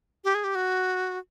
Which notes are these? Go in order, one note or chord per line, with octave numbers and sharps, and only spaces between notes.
G4
G#4
G4
F#4